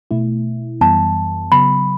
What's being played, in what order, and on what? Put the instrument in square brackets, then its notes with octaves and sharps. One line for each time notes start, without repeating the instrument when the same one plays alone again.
[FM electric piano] B2 A3 E4
[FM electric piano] F#2 E3 G3 B3 [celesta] A5
[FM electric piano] C#3 F#3 B3 [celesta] B5